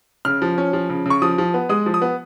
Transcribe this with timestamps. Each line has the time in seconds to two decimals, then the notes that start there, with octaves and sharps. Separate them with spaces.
0.25 C#3 F6
0.42 F3
0.58 C#4
0.73 F3
0.89 C#3
1.06 C#3 C#6
1.22 F3 D#6
1.38 F3
1.54 B3
1.69 G#3 D#6
1.86 F3
1.94 D#6
2.02 B3